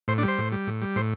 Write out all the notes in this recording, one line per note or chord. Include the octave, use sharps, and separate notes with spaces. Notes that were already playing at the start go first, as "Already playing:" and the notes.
A2 C5
D4
G3
C5
A2
G3
A2
G3
A2 C5